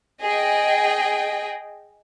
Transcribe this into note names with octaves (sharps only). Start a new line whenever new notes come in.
G#4 D#5 G5